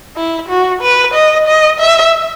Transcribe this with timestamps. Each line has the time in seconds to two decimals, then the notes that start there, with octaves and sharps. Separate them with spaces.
0.16 E4
0.49 F#4
0.81 B4
1.14 D#5
1.47 D#5
1.79 E5